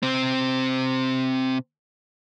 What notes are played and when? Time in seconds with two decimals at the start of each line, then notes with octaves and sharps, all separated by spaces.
0.03 C3 C4